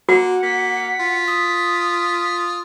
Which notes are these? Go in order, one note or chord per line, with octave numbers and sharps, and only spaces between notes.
A#3 F#4 F#5
A#3 B6
F4
D#6